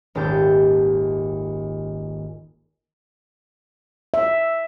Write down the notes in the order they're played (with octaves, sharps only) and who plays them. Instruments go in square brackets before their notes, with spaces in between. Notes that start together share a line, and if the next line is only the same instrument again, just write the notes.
[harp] D#1 G#1 G#2 G4 A5 G6
[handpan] E5